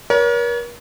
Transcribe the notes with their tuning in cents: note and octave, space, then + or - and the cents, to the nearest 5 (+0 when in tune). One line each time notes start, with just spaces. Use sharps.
A#4 +40 C#5 +35